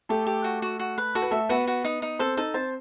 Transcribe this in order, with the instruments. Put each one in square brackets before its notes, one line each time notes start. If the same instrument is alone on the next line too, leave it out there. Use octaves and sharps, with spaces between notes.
[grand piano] A3 A4 [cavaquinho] G4
[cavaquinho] G4
F#4
F#4
F#4
B4
[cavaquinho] F#4 [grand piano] A4
[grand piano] B4
[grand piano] A3 A4 [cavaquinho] E5
[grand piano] B3 B4 [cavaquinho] F#4
[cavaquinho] F#4
D#4
D#4
[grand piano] C4 C5 [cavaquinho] A4
[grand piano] D#4 D#5 [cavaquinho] A4
[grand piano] C4 C5 [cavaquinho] A5